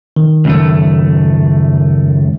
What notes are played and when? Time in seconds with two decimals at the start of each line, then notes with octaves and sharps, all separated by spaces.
0.16 D#3
0.45 C#2 F#2 A3